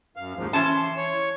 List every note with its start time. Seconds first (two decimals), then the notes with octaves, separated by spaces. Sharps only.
0.17 F#2 F5
0.36 D#2 G#2 F3
0.53 E3 C#4 A5 C6
0.97 C#5